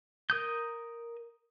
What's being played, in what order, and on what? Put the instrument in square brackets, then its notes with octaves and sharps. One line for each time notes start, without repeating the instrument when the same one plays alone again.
[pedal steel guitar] A#4 D#6 G6